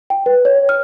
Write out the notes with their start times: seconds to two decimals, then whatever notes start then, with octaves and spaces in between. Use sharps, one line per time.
0.10 G5
0.26 B4
0.45 C#5
0.69 F6